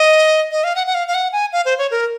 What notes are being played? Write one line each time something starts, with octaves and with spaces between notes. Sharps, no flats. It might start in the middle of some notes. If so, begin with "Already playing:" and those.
Already playing: D#5
D#5
F5
F#5
F#5
F5
F5
F#5
G#5
F5
C5
C#5
A#4